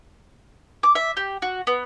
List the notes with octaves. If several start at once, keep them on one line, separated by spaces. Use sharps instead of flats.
D6
E5
G4
F#4
B3